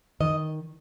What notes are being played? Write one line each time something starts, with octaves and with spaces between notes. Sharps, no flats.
D#3 D#5